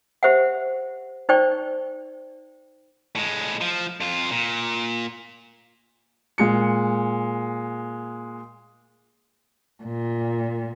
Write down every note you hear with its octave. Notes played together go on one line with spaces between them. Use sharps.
G4 C5 E5 F#5
D#4 C5 D5 G5 C#6
A2 G#3
F3
F2 F4
A#2
A#2 G#3 C#7
A#2